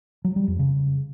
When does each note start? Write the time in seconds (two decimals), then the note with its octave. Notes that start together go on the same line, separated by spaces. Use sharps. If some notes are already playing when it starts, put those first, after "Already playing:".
0.24 F#3
0.36 G3
0.48 F2
0.59 C#3